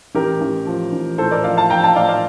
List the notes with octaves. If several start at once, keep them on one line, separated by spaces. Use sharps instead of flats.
A1 G4 A#4
A1
F3
A1
A2 A4 C5
A#4 D5
F3 D5 F5
F5 A5
F3 G5 A#5
F5 A5
A2 D5 F5
D5 F5